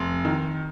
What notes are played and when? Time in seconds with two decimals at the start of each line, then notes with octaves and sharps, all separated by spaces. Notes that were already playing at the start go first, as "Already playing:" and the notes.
Already playing: F1 C6
0.25 D#3